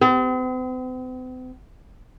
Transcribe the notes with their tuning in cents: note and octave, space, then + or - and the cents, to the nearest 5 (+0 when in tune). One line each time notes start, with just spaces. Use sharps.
C4 -45